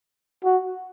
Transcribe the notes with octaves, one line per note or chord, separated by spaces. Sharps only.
F#4